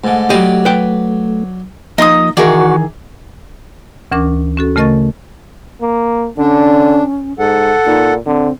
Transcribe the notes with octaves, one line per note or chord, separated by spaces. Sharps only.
G#2 D3 A3
F#3 G4 D5 D#5
B4 G5
F3 A#3 D#4 D#5 C6 D#6
D#3 E3 F#4 G#4 A#4 D5 F#5 C#6
D2 E3 C#4 A#4 D6
C#4 F#4 A4
C#3 A3 A#4 D#5 C#6 A6
A#3
D3 C#4 D4
G#2 A4 F#5
A#2 D#4
D3 C4